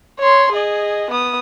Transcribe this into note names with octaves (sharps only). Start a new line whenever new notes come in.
C#5 C6
G#4 D#5
B3 D#6